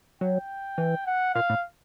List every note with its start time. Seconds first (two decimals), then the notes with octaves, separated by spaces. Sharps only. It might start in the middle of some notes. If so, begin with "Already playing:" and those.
0.21 F#3 G5
0.78 E3
1.06 F#5
1.34 A#2 F5
1.50 A2